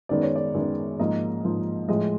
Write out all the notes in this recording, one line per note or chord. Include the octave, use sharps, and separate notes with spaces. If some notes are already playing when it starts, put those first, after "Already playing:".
F#2 D#3 G#3 B3 D5
C#5
D5
F#2 D#3 G#3 B3
G#2 F3 A#3 D#5
G#2 F3 A#3
A2 F3 G#3 D#5